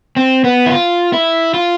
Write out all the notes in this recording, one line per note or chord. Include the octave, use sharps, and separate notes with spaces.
C4
B3
E4
F4
E4
F4